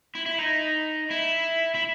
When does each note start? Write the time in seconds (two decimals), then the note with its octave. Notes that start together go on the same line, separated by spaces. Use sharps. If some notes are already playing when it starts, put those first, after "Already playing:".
0.15 E4
0.26 E4
0.39 D#4
1.10 E4
1.74 E4